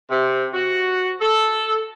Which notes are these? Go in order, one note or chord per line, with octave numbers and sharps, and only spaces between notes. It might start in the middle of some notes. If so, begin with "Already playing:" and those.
C3
F#4
A4